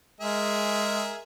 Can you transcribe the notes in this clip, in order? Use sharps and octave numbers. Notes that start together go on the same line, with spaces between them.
G#3 G#4 A#4 E5